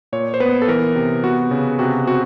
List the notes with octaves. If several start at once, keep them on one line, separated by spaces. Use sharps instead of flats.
A#2 C#5
C5
B3 B4
A4
E3 A#4
C3
B3 F#4
C#3
C3 F#4
C4 F#4